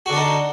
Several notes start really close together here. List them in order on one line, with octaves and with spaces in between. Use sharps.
F#4 D3 D4 D#4